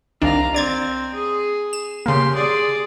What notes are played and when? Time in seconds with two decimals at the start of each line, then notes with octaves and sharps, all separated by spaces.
0.22 C2 D#3 D4 F5 A#5
0.54 C4 D5 G#6 A6
1.14 G#4
1.73 E7
2.06 C#3 A#3 G4 C6
2.34 G#4 D5